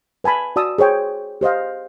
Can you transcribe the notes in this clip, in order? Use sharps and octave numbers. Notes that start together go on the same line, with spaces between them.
B4 G#5 A5 B5
F#4 D5 A5 D#6 E6
G#4 C5 C#5 G5
G4 C5 D#5 F5